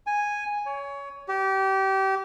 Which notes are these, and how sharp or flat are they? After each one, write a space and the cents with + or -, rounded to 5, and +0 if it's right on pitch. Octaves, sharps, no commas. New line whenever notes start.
G#5 -5
C#5 +20
G4 -25